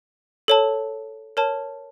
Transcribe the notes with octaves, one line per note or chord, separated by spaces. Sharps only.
A4 C#5 A5
A#4 C#5 A5